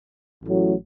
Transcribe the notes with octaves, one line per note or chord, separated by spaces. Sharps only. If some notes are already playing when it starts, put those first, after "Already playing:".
A1 A2 F#3